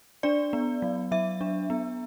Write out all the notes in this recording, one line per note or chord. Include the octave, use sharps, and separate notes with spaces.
D4 D5
B3
F#3
F#3 E5
D4
B3